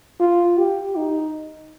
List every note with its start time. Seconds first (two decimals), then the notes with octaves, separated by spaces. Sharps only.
0.20 F4
0.58 G4
0.96 D#4